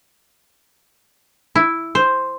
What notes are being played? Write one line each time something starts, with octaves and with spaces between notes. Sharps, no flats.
E4
C5